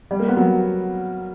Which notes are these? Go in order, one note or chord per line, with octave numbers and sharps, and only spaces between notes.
G3
A#3
B3
F#3